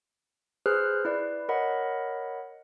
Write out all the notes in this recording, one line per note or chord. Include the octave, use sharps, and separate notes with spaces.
G#4 B4 C5 F6 F#6
E4 B4 D5
A#4 C#5 D#5 F#5 B5